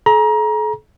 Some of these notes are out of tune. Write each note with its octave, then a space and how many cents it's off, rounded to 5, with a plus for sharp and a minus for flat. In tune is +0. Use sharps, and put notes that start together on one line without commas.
A4 -45 A#5 +25